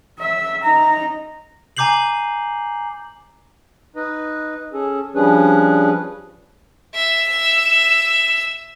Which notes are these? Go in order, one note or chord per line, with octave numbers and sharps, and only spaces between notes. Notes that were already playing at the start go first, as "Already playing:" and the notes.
E5
D#4 A#5
G#5 A#5 D6 G6 C7 F#7
D#4 B4 D#5
C#4 G#4 A4
F3 G3 C#4 D4 G#4 B4
E5 E6